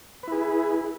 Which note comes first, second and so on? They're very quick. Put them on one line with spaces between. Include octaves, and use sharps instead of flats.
B4 E4 G#4